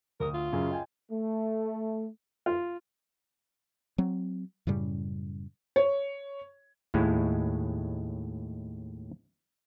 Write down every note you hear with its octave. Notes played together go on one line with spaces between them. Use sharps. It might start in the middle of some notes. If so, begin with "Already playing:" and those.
D2 A#4 D#6
F4
F#2 C#3 G#4
D#5 G5 G#5
A3
F4
F#3 C4
F#2 A2 C#3 G3
C#5
D#2 A2 G#3 E4